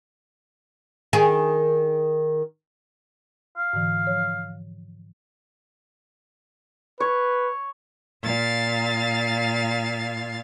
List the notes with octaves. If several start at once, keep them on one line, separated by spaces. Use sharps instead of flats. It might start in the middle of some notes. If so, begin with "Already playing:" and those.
D#3 G#4
F5
G#2 D3 E3
F3 C#5
B4 C#5
A#2 F5 A6